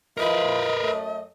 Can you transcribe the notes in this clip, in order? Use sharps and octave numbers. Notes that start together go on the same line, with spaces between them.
F3 E4 A#4 B4 D#5
F#2 A3